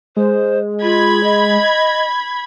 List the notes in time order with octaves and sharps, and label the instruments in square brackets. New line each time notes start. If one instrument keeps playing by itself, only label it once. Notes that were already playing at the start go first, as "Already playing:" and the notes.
[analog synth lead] G#3 [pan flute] C5
[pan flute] F4 [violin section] B5 G#6
[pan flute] D#5